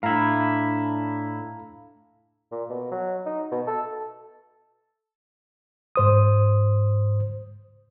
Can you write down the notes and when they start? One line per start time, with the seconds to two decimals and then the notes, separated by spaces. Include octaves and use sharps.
0.03 A2 D4 E4 F5 A#5
2.52 A#2
2.70 B2
2.91 F#3
3.26 D#4
3.51 B2
3.67 A4
5.96 G#2 C5 D#6